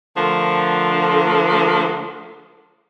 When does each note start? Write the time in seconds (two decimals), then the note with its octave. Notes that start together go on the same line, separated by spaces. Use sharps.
0.17 D3 F3 A3 A#4